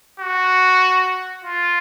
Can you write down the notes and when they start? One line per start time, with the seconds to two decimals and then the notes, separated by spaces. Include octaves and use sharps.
0.20 F#4
1.44 F4